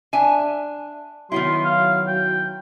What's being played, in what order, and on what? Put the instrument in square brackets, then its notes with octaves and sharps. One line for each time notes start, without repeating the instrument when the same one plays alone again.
[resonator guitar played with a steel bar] D4 E5 G#5
[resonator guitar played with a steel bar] D#3 B3 E4 [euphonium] F#3 [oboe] C6
[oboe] F5
G5